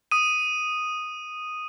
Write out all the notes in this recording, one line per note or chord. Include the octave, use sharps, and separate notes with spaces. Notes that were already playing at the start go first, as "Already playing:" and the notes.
D#6 D#7